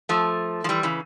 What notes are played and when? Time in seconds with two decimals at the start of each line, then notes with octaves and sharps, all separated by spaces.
0.09 F3 A3
0.64 F3
0.69 E3 G3
0.83 C#3 E3